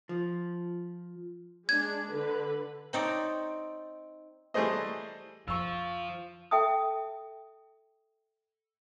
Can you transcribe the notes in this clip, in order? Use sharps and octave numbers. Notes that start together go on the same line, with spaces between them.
F3
G#3 D4 G#6
D3 B4
C4 D#4 C#5 D5
E3 G3 A3 G#4 C5 D#5
F2 F3 F5 C#6 E6
A4 E5 G5 A5 D#6